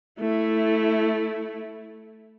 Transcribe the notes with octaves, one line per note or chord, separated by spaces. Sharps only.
A3 E4